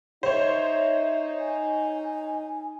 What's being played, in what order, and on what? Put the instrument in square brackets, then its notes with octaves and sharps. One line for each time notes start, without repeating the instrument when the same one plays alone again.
[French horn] D#4 [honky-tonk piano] C5 C#5 [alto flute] E5
[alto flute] G#5